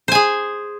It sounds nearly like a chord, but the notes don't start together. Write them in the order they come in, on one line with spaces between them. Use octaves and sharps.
C5 G#5 G#4